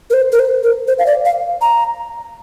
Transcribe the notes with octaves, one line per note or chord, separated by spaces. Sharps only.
A#4
C5
A#4
C5
A#4
C5
F5
D5
F5
A#5